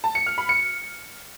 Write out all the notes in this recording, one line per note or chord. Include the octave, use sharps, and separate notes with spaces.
A5
C#7
F6
B5
C#7